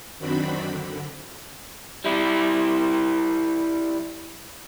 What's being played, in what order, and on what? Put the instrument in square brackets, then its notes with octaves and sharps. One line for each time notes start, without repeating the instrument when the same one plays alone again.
[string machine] F#2 D#3 C4 D4 F#4 B5
D3
[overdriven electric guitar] G3 E4